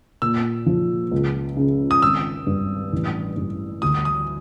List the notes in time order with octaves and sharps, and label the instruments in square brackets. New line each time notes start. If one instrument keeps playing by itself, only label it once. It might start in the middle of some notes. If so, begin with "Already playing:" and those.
[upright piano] A#2 [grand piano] E6
[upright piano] F3
C#2
C#3
[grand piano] D#6
[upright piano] G#1 [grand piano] E6
[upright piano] G2
A1
G2
[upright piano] D2 [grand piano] D#6
[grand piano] D#6